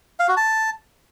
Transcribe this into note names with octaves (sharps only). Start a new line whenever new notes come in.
F5
F#4
A5